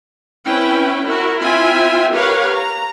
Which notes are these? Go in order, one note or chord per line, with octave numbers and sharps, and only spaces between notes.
C4 C#4 E4 B4 G5
E4 F#4 A#4
C4 E4 F4 E5 G5 G#5
G4 A#4 B4 C#5 F5 F#5
A#5